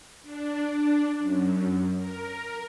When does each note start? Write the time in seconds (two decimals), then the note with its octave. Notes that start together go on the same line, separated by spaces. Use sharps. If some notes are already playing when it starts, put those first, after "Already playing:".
0.23 D4
1.19 F#2
1.98 A#4